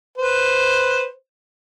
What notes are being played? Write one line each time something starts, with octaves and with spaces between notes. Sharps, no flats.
B4 C5